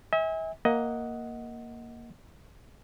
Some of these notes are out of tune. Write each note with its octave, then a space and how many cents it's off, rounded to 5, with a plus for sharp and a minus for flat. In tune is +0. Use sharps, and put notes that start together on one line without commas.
E5 -40 G#5 -30
A#3 +0 D#5 +15 F#5 +0